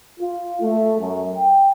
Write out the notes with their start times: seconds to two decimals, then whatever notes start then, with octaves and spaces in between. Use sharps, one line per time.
0.19 F4
0.61 A3
0.99 F#2
1.37 G5